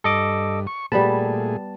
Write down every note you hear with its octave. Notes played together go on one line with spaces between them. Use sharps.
G2 A4 D#5 D6
C#6
A#2 G3 A3 B3 G#4 B4 A5